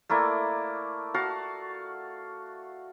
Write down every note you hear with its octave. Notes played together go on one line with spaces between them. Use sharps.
A3 A#3 E4 D5
F#4 F5 A5